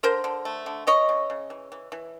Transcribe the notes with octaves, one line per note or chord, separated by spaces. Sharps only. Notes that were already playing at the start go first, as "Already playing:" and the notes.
D3 A#4 C5
D3
A3
D3
E3 C#5 D#5
C#3
C#3
E3
E3
E3